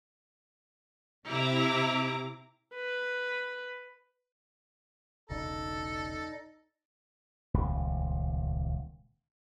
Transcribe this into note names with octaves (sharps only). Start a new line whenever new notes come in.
C3 E4 A#5 D6
B4
E1 B1 C#3 D#4 A4 D5 D#5
D#1 C#2